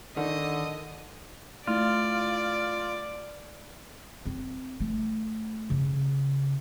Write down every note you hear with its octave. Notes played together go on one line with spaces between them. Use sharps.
D3 D#3 D#5
A3 E4 F4 D5
C4
A3
C#3